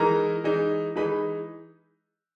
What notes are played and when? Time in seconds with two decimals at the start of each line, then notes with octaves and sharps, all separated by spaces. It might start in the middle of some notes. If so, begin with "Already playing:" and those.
Already playing: E3 G#3 D#4 A#4 A#5
0.44 E3 G#3 D#4
0.96 E3 G#3 D#4 B4 B5